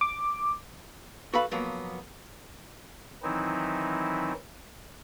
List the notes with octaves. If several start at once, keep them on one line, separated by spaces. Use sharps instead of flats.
D6
F#4 A4 B4 F5 B5
F3 F#3 A#3 B3
D#3 E3 F#3 C4 D#4 E4